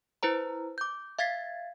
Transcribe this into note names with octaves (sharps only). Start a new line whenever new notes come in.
E4 B4 C5 A#5
D6 G6
E5 F5 G#6 A6 B6 C7